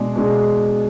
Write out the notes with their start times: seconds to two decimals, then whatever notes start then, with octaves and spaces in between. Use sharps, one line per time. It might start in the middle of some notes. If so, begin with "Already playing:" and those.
Already playing: B2 G#3 D4 G#4
0.16 B2 G#3 D4 G#4